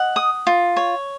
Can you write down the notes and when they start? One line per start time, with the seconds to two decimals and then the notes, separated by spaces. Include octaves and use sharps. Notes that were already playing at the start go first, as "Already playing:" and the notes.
Already playing: D#5 F#5
0.16 D#6
0.47 F4
0.77 C#5